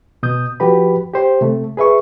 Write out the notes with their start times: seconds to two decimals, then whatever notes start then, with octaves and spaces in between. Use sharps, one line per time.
0.23 B2 D#6 G6
0.60 F3 F#4 G4 B4 B5
1.13 G4 C5
1.41 C3 A3
1.77 G#4 B4 E5 C#6